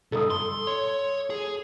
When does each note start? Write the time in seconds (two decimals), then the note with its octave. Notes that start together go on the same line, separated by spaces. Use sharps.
0.12 C2 G2 A4 D#6
0.30 C6
0.67 C#5
1.30 G#4